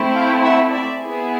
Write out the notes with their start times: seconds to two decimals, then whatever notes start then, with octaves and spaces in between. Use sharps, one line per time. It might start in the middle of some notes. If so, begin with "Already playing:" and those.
Already playing: A3 C4 E4
0.15 F5 G5
0.44 E5 F#5
0.72 D5 E5
1.00 B3 E4 G#4